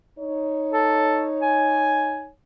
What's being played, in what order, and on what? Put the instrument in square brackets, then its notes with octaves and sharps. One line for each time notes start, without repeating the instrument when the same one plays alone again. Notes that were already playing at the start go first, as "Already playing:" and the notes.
[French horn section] D#4 C#5
[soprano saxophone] A4
G#5